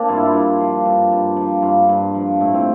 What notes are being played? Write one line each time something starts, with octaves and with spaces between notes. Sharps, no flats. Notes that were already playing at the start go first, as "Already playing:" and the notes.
Already playing: A#3 C4 D4
G2 F4
E4
F4
G2
F3
G2
G2
F3
G2 F4
G2
F3
A2
C4